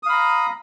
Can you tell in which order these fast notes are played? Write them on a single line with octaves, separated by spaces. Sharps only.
D#6 F5 B5 A#5